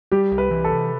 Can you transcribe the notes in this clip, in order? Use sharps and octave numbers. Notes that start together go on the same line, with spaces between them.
G3 G4
C2
B4
E3
A4
C3